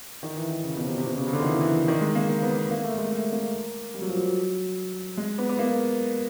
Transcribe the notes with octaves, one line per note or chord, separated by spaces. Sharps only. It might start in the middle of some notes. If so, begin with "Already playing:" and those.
D#3
E3
D#3
C#3
B2
C3
C3
B2
C#3
C3
C#3
D3
D#3
E3
E3
D#3
G#3
A#3
A#3
B3
B3
A#3
A3
G#3
A3
A#3
G3
F#3
F3
F#3
G#3
B3
B3
A#3